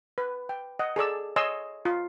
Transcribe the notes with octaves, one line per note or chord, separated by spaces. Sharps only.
B4
G5
D#5 F#5
G#4 A4 D5 E6
C#5 D#5 G#5 C6 E6
F4